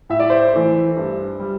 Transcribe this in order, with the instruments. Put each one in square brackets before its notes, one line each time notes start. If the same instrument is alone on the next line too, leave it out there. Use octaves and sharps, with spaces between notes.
[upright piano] A2 E5
D5
C5 E5
E3 A3
G2
G3